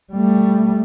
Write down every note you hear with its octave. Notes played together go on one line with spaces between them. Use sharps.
G3 A3